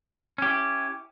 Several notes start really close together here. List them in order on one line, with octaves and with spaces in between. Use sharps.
C#4 G4 E4